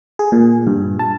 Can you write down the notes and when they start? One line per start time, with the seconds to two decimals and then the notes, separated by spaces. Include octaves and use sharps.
0.19 G#4
0.32 A#2
0.67 G2
0.99 A5